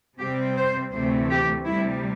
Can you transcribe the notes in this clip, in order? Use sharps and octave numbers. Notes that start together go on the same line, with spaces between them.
C3 G3 C4 G4
C5
D2 C3 E3 A3 C4 C5
G4
D2 C3 G3 E4